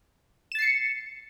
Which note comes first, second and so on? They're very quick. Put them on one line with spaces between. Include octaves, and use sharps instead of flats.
E7 A6 C7 C#7